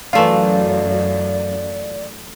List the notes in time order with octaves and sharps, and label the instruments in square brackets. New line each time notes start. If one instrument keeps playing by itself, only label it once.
[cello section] F#2 [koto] E3 A3 F4 [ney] D5 [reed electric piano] F5